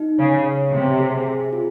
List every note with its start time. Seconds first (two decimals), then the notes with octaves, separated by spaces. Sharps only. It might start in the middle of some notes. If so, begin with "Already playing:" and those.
Already playing: D#4
0.19 C#3 C#5
0.46 C#5
0.73 C3 C4
1.00 G#4
1.26 G#4
1.53 F4